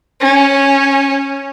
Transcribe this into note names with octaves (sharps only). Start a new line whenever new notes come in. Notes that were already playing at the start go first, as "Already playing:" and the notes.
C#4